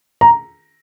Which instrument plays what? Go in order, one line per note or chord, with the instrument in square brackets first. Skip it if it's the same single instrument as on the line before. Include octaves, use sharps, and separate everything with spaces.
[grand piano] A#5